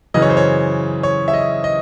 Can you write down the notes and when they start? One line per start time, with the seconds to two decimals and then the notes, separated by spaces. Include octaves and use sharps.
0.14 F#2 C#3 E3 D#5
0.22 C#5
0.30 C5
0.37 C#5
1.03 C#5
1.28 E5
1.34 D#5
1.64 D#5